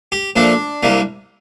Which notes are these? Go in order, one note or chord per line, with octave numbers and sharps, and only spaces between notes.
G4
A#2 F3 A3 D4
C2 C3 G3 A#3